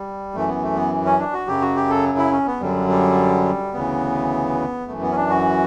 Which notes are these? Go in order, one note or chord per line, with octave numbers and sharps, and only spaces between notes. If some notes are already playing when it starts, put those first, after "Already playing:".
Already playing: G3
F#2 E3 A3
B3
A3
B3
C#4
D4
F#4
F#2 C#3 F#3 G4
F#4
G4
A4
E4
C#4
B3
F#2 D3 F#3 G3
G3
D2 C#3 E3 B3
F#2 E3 A3
B3
C#4
D4
F#4